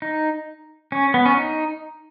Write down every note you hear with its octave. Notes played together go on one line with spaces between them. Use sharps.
D#4
C#4
B3
C#4
D#4